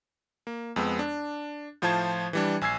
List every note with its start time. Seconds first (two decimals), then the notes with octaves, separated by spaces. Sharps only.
0.47 A#3
0.76 F2 G#3 B3 E6
0.99 D4
1.82 A2 F3 F4 C5 A5 G#6
2.33 E3 G3 D4
2.61 A#1 G#5 E6 G#6 C7